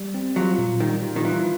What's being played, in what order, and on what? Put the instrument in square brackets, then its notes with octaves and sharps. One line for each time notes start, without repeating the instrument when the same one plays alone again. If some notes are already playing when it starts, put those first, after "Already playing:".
Already playing: [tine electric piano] G3
C4
[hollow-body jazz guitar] F#3 [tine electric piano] F4
[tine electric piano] A#2
[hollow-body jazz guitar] D#3 [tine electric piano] G3
[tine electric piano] F4
[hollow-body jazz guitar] D#3
[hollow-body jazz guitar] E3 [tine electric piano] F4